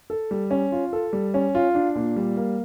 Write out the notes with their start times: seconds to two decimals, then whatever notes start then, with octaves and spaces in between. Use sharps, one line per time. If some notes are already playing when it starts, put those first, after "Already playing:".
0.10 A4
0.31 G3
0.51 C#4
0.72 F4
0.93 A4
1.13 G3
1.34 C#4
1.55 F4
1.75 D4
1.95 A#2
2.16 G3
2.37 A#3